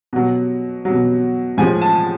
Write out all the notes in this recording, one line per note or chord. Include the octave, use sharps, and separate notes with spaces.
B2 F#3
B2 F#3
A2 F3 G#3 G#5
A5